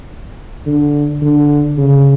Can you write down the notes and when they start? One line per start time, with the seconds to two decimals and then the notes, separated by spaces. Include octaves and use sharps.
0.67 D3
1.22 D3
1.78 C#3